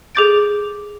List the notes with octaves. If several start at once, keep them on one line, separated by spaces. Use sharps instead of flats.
G#4 A4 D6 G6 A6 D7